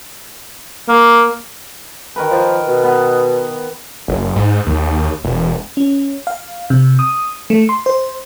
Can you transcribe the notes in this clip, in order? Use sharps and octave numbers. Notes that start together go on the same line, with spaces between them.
A#3
D#3 A#4 B4
F3
B2
B3
F#1
G#2
D#2
E1
C#4
F5
C3
D#6
A3
C6
C5